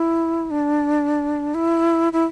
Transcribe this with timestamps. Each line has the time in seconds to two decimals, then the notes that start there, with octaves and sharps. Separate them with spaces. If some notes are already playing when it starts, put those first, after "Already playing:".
Already playing: E4
0.51 D4
1.54 E4
2.13 E4